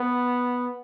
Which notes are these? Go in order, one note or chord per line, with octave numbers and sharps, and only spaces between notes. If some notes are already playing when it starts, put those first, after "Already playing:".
Already playing: B3